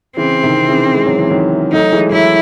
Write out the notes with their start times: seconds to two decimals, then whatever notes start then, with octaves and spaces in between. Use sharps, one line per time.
0.17 C#3 E3 C4
0.43 C3 D#3
0.69 C#3 E3
0.94 G#3
1.06 F#3
1.18 E3
1.30 D#3 F#3
1.73 F#3 A3 D#4
1.92 E3 G#3
2.12 F#3 A3 E4